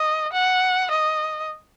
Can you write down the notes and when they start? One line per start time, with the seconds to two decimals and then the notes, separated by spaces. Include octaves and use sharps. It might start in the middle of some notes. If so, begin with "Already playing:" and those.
Already playing: D#5
0.33 F#5
0.91 D#5